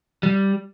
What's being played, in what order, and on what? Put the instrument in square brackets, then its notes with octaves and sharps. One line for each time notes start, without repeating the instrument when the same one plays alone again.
[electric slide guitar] G3